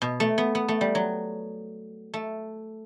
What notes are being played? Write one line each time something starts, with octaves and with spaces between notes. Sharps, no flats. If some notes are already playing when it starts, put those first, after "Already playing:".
B2
A3
B3
B3
A3
G3
F#3
A3